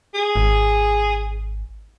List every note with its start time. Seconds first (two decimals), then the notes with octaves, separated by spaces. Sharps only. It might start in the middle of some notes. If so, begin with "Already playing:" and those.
0.14 G#4
0.36 G#1